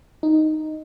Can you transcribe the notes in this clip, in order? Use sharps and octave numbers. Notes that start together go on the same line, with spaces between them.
D#4